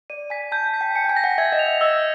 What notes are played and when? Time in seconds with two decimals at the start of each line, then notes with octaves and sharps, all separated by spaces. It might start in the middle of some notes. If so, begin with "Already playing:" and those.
0.10 D5 D#7
0.30 G#5 B6
0.52 A5 G6
0.66 A5
0.74 B6
0.81 G5
0.95 G#5 C#7
1.04 G5
1.09 G#5
1.17 A#6
1.24 F#5
1.38 E5 G#6
1.52 D#5
1.59 F7
1.66 E5
1.81 D#5 E6